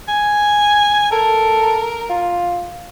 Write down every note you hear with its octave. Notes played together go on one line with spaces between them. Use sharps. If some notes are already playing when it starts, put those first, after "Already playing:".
G#5
A4 A#4
F4